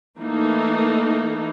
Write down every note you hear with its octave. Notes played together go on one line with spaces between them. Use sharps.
E3 A3 A#3 D#4 A4